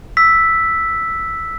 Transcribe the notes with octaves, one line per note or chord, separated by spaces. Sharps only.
E6 B6